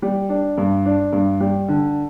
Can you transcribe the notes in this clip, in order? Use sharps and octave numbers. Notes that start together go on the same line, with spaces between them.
G3
D4
G2
D4
G2
G3
D3